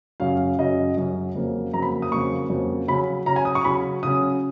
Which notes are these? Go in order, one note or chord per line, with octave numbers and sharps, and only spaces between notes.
F#2 C#3 F#3 C#4 F5
F#2 C#3 F#3 C#4 D#5
F#2 C#3 F#3 C#4
F2 C#3 F#3 A#3
F2 C#3 F#3 A#3 A#5
B5
D#6
F2 C#3 F#3 A#3 C#6
F2 C#3 F#3 A#3
C#3 F#3 C#4 B5
C#3 F#3 C#4 A#5
G#5
D#6
C#6
C#3 F#3 C#4 B5
C#3 F#3 C#4 D#6